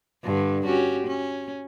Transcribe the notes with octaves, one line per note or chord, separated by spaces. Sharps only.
G2 D3
C#4 F#4 G4
C#4